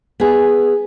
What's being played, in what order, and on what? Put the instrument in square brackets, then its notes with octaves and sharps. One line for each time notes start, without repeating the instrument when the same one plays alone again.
[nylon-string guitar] B3 G#4